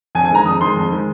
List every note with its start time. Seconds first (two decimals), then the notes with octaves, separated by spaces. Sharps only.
0.15 F2 G#5
0.25 G#5
0.30 D#3 G#3 A#5
0.46 F2 D#6
0.61 D#3 G#3 C6
0.76 F2
0.92 D#3 G#3